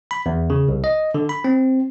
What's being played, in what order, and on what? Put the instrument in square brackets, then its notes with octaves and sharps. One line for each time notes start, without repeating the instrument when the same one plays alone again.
[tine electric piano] B5
E2
C#3
C2
D#5
D3
B5
C4